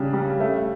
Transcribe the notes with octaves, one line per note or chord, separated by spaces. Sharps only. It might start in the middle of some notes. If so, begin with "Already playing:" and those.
Already playing: C#3 G3 D4
G3
A3